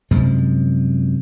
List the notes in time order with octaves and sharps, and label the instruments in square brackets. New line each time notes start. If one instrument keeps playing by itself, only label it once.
[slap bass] F#2 C3 F3 G#3